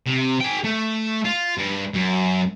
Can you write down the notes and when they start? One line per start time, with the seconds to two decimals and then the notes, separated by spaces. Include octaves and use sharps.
0.06 C3
0.40 G#4 G5
0.64 A3
1.25 F4
1.58 G2
1.94 F#2